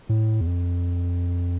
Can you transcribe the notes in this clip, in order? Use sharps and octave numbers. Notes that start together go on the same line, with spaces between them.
A2
E2
F2